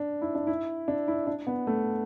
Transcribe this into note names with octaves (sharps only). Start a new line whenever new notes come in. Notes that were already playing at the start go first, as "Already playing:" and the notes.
Already playing: D4
E4
D4
E4
D4
E4
D4
B3
A3